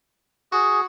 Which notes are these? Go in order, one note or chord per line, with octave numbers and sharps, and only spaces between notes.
F#4 G#4